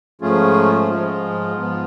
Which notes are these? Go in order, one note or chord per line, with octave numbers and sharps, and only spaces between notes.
G#2 F3 A3 C#4 F4 G#4
G#2 F3 G#3 F4
G#2 F3 B3